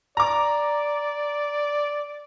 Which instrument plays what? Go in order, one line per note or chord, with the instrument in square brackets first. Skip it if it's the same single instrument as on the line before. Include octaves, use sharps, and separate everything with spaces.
[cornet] D5 [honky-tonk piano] A#5 D6